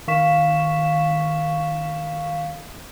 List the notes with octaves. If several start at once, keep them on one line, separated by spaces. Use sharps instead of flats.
D#3 F5 C#6 B6 E7